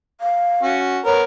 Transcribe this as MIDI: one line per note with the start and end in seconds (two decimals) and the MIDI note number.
0.21 0.75 77
0.63 0.99 61
0.63 0.99 66
1.05 1.22 59
1.05 1.22 70
1.05 1.22 73